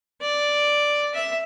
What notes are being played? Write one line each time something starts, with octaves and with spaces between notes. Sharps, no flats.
D5
E5